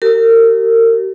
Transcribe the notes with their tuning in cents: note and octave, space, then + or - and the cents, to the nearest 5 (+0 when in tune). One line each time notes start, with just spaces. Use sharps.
G4 -40 A#4 -35